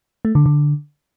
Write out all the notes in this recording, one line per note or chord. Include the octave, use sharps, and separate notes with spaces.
A3
D3
D3